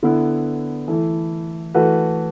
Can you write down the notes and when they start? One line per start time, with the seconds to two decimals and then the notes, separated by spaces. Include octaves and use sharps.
0.03 D3 B3 E4
0.88 E3 A3 E4
1.74 E3 A3 F#4 B4